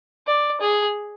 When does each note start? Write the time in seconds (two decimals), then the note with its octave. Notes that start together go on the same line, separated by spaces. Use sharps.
0.27 D5
0.61 G#4